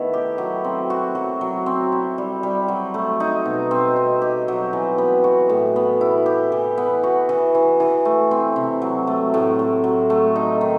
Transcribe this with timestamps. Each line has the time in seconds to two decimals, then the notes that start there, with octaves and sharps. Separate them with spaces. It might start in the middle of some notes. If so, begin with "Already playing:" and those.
Already playing: D#3 A3 B3 E4 A4
0.14 G4
0.38 F#3
0.64 C4
0.90 F#4
1.15 F#3
1.41 F#3
1.66 C4
1.92 E4
2.18 G3
2.43 G3
2.68 F#3
2.94 A3
3.20 D#4
3.46 B2
3.71 C4
3.96 D#4
4.22 G4
4.48 F#3
4.73 E3
4.98 B3
5.24 F#4
5.49 A2
5.76 B3
6.01 E4
6.26 G4
6.52 E3
6.78 B3
7.03 F#4
7.29 E3
7.55 E3
7.80 E3
8.05 A3
8.31 C4
8.56 C3
8.82 F#3
9.07 A3
9.34 A2
9.59 A2
9.84 F#3
10.10 A3
10.36 D#4
10.61 D#3